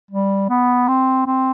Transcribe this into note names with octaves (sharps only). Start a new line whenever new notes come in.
G3
B3
C4
C4